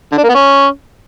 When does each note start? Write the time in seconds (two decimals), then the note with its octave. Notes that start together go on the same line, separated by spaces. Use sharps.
0.12 D3
0.18 D4
0.23 A#3
0.29 B3
0.35 C#4